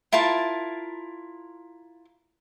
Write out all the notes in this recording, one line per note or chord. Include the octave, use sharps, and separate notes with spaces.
E4 F4 A#4 A5